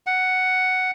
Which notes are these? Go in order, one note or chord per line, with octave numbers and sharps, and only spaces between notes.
F#5